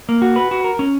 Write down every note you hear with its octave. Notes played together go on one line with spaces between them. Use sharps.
A#3
F#4
B4
F#4
A#4
C#4